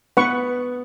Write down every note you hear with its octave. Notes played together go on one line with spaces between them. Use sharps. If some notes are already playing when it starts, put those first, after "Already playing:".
B3 B4 F#5 C#6